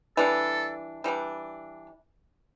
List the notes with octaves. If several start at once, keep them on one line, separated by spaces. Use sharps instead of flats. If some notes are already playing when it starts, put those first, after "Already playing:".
E3 G3 D4 A4
E3 G3 D4